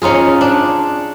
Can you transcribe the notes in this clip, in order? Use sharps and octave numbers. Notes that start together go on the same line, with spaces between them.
C#4 D#4 F4 G#4
D4